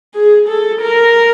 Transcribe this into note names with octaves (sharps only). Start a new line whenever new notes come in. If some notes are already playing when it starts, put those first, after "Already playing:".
G#4
A4
A#4